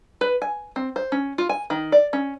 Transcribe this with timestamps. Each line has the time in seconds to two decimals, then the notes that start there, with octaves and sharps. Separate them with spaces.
0.21 B4
0.42 G#5
0.76 C4
0.96 C5
1.12 C#4
1.38 F4
1.49 G#5
1.70 D#3
1.92 D5
2.13 C#4